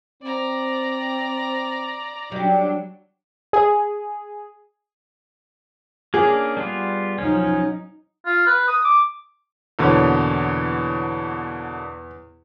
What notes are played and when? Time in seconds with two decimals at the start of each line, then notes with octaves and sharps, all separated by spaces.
0.23 C4 D5 A#5
2.32 F#3 G3 D4 G4
3.53 G#4
6.14 A#3 C#4 D4 G#4
6.57 G3 B3 F4
7.18 F3 F#3 C#4 D#4
8.26 F4
8.46 B4
8.68 D#6
8.84 D6
9.79 E2 B2 D3 A#3 C#5